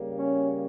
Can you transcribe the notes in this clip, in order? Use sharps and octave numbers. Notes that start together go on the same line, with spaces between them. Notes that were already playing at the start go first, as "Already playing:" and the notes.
Already playing: C#3 G3 A#3
C#4